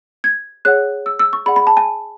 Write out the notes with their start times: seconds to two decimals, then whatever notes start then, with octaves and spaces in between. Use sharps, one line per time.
0.24 G#6
0.65 G#4 C#5 F#5 F#6
1.06 E6
1.19 E6
1.33 C#6
1.46 G#4 D5 F#5 B5
1.56 B5
1.67 A5
1.77 G#5